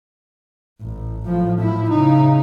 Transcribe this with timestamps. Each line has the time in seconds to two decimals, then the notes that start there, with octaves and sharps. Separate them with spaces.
0.81 A1
1.26 A2 F3
1.59 A2 E4
1.90 C#3 D#4